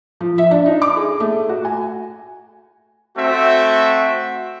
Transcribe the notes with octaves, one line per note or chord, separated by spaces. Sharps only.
F3
E5
D4
D#4
D6
G#4
A3
F#4
G#5
A3 C4 F#4 E5